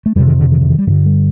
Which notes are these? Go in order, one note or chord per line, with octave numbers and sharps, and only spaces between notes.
A3
F2 C3 G3
D#3
D3
D#3
D3
D#3
G3
G2 D3 F3
G3